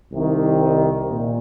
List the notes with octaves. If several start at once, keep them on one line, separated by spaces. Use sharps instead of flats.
C2 C3 D#3
A#2